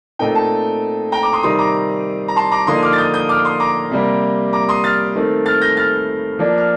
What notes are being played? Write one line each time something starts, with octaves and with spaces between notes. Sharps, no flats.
A#2 A3 C4 D#4 G5
A5
G5 A#5
A#5 D6
C6 D#6
C3 D#3 G3 C4 D#4 C6 D#6
A#5 D6
A#5
A5 C6
A#5 D6
D3 F3 A#3 D#4 C6 D#6
D6 F6
A6
D#6 G6
D#6 G6
D6 F6
C6 D#6
A#5 D6
C3 G3 A#3
A#5 D6
C6 D#6
F6 A6
D#3 A3 C4
F6 A6
G6 A#6
F6 A6
F3 A#3 D4
F6